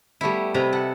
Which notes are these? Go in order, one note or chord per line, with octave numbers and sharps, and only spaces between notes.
G3 A3 B3 E4
C3 E4 B4 D#5 A#5
A4 F#5